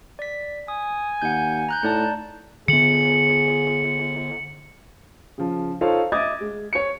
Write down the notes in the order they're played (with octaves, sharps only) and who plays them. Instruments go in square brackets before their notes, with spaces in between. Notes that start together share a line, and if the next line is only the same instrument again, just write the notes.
[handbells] D5 B6
[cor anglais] G#5 [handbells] D#6
[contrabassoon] D#2 [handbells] F#5 G6
[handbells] A#5 F#6 G6
[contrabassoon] A2 [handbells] D#4 D5 A5
[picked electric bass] D3 B3 [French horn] G#4 [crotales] C#7 F#7
[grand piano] C#3 F3
D#4 F4 A4 C5 C#5 F5
D#5 E5 D6 D#6 G#6 A6
G#3
C#5 C#7